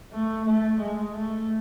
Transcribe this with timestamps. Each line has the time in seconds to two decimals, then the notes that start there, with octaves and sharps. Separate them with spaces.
0.13 A3
0.46 A3
0.81 G#3
1.15 A3